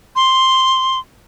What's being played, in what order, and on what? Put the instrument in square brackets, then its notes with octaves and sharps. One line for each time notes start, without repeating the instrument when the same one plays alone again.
[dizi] C6